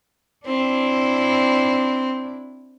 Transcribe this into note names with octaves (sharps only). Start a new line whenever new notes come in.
C4 D4 E4